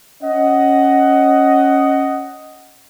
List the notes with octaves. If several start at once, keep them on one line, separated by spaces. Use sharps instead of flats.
C#4 D#5 F#5